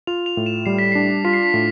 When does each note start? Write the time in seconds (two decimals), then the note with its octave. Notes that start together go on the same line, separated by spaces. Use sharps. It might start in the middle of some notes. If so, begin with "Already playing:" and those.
0.07 F4 F7
0.26 F7
0.37 A2
0.46 E7
0.66 G3 C7
0.79 B6
0.92 D4 C7
1.25 F4 B6
1.33 C7
1.43 B6
1.54 A2